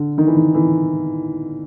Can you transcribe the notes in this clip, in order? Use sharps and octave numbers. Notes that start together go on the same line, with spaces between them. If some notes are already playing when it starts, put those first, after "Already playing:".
Already playing: D3
D#3
E3
D#3
E3